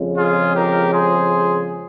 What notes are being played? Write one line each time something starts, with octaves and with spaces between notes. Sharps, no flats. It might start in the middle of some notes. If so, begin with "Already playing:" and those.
Already playing: F2 C#3 G#3
F4 G#4
G4 A#4
G#4 C5